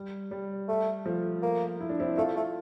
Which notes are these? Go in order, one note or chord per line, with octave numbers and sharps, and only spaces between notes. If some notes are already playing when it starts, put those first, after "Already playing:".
Already playing: G3
G3
A3
F3 A3
A#3
E4
D4
C4 E4
A3 F4 A4
A3